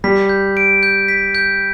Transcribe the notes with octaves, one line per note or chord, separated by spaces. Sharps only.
G3 B6
G6
D7
G6
B6
G6